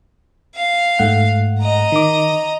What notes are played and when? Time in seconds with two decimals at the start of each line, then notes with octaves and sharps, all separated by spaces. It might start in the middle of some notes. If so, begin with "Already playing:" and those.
0.55 F5
0.99 G#2 A3 F#5
1.60 D#5 A#5
1.92 D#3 D6